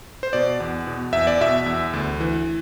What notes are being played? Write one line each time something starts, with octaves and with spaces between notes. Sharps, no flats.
C5
B2 D5
E2
B2
E2 E5
D5
B2 E5
E2
D2
E3